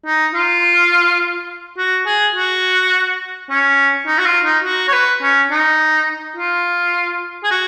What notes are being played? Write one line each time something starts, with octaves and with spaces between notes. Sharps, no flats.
D#4
F4
F#4
G#4
F#4
C#4
D#4
F#4
F4
D#4
F#4
C#5
B4
C#4
D#4
F4
G#4
F#4